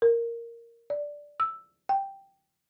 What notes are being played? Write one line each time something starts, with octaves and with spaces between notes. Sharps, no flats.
A#4
D5
E6
G5